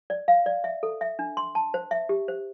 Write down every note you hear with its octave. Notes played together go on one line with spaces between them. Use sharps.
D5
F5
D5
E5
A4
E5
D4
C6
A5
C5
E5
G4
C5